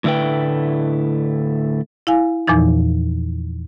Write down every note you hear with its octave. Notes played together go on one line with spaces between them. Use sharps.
A2 D3 A3 E4 B4 G5
E4 F5 G#5
E2 A#2 E3 F3 D#4